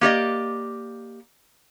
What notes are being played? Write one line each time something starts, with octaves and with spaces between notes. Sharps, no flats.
A#3 G4 D5 D#5